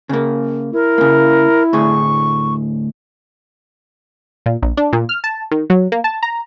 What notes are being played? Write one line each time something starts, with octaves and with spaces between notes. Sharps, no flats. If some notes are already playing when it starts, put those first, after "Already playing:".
C#3 A#3
E4 A#4
C#3 A#3
D2 A2 G#4 C#6
A#2
A#1
D4
A#2
F6
A5
D#3
F#3
A#3
A5
A#5